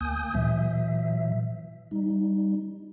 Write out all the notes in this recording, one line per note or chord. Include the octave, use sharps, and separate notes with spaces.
D2 A#3 G#5 D#6 G6
A#2 E3 F#3 E5
G3 D#4